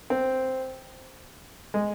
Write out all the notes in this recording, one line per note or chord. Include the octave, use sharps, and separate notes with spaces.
C4
G#3